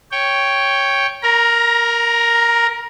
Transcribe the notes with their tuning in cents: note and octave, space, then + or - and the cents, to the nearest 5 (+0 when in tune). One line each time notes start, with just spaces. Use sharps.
C#5 +0 G5 +0
A#4 +0 A#5 +30